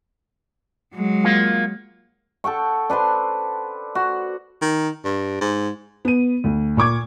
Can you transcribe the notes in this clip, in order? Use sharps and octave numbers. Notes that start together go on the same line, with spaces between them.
F#3 G#3
A#3 F4
A4 F#5 G5 C#6
D4 B4 C5 C6
F#4
D#3
G2
G#2
B3 D#7
D2
A#2 C#6 D6 G#6